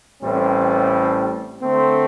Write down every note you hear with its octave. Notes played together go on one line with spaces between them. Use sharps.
A1 A2 G3 C4
D3 A3 C4